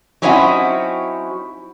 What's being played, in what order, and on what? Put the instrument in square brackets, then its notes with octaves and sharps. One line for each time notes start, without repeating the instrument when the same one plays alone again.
[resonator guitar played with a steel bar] F#3 C4 C#4 D#4 E4 F#4